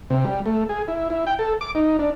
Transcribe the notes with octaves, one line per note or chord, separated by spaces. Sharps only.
C3
G3
A3
G#4
E4
E4
G5
A4
D6
D#4
D4